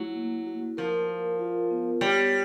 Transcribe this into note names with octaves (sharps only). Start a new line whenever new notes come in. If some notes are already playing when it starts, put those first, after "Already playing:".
Already playing: F#3 A3 E4
A#3
F#4
F3 A#4
A#4
F4
B3
G3 C#5